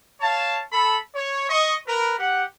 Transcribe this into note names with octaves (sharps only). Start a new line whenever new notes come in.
C#5 F5 A5
A4 B5
C#5
D#5 C#6
A#4 B4
G4 F#5